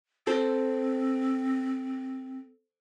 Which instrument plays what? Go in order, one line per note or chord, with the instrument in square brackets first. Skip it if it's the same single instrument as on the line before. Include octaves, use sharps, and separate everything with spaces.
[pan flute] C4 [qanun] A4 C5